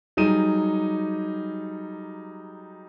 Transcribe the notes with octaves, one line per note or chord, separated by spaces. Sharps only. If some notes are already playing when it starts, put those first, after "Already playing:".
F#3 G3 D#4 G#4 D#7